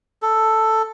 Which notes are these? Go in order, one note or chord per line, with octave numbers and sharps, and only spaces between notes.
A4